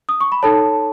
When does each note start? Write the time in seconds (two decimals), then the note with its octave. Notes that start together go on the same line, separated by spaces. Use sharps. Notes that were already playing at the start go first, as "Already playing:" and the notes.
0.09 D#6
0.21 C#6
0.32 B5
0.43 D#4 A4 C#5 A5